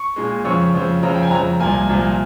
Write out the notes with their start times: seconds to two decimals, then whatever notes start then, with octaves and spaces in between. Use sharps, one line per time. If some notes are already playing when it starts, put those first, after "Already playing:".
Already playing: C#6
0.16 A#2 G#3
0.44 F2 C#3 F3 C#6
0.74 F2 C#3 F3
1.02 F2 C#3 F3 A#5
1.15 G5
1.23 G#5
1.30 F2 C#3 F3 A#5
1.60 C2 A#2 F3 A#3 G#5
1.89 C2 A#2 F3 A#3